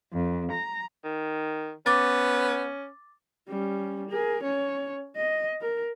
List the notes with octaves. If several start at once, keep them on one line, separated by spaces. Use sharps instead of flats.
F2
A#5
D#3
B3 C#4 D6 A6
G3 C#4
G#4 A#4
C#4 C#5
D#5
A#4